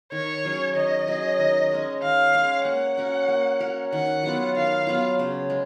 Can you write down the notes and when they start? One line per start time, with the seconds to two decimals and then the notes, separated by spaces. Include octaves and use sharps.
0.12 D#3 C#5
0.45 F#3 C#4 G#4
0.75 D#3 D#5
1.08 F#3 C#4 G#4
1.38 D#3
1.71 G#3 C#4
2.02 D#3 F5
2.34 G#3 C#4
2.65 A#3 F#5
2.98 C#4 F#4 A#4
3.28 A#3
3.60 C#4 F#4 A#4
3.93 D#3 F#5
4.23 F#3 B3 F4
4.55 D#3 F5
4.87 F#3 B3 F4
5.19 C#3
5.50 G#3